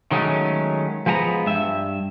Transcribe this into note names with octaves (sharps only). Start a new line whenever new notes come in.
D#3 F#3 G#3 A3 C#4
F3 G#3 B3 G#5 A#5
G2 E5